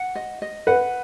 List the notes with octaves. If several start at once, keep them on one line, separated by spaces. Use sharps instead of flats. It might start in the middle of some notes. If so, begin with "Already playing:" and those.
Already playing: F#5
D#5
D#5
B4 F#5